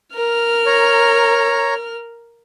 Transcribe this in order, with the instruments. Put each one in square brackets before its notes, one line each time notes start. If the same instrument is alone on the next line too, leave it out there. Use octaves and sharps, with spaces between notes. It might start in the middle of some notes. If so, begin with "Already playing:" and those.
[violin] A#4 F6
[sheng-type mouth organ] C#5 A#5